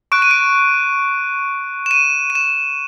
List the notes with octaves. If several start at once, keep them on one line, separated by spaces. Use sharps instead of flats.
C#6 F#6 D7
D#7
D7
E7
D#7
D#7
E7